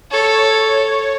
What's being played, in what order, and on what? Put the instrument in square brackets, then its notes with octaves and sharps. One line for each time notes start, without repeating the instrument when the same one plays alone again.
[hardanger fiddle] A4 [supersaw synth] C#5